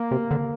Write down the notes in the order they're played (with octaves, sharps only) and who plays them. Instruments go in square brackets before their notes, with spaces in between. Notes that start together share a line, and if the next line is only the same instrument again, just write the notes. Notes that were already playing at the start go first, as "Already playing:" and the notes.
Already playing: [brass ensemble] A#3
[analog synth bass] C3
D3